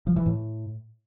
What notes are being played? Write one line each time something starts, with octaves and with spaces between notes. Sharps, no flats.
F3
E3
A2